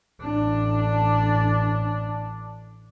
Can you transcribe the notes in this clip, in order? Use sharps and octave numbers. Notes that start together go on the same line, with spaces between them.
A1 D4